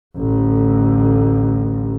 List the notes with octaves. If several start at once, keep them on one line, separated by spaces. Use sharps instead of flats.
A1 D2